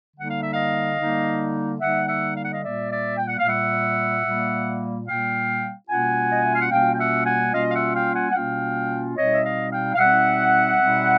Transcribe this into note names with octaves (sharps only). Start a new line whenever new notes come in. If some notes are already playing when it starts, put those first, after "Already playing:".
D3 G3 A#3 D#4 F#5
F5
E5
D#5 F5
D3 G3 A#3 D#4
D3 G3 A#3 D#4 E5 F#5
E5 F#5
F5
F#5
D#5 F5
A#2 G3 A#3 D5 E5
D5 E5
G5
F#5
F5
A#2 G3 A#3 E5 F#5
A#2 G3 A#3
A#2 G3 A#3 F5 G5
B2 G3 A#3 C#4 F4 F#5 G#5
D#5
E5
F5
F#5
B2 G3 A#3 C#4 F4 F5 G5
G5
E5 F#5
F#5 G#5
B2 G3 A#3 C#4 F4 D#5 F5
F5
E5 F#5
F5 G5
F#5 G#5
F#5
B2 G3 A#3 C#4 F4 F5 G5
B2 G3 C4 D#4 C#5 D#5
E5
D#5 F5
F5 G5
F5
B2 G3 C4 D#4 E5 F#5
B2 G3 C4 D#4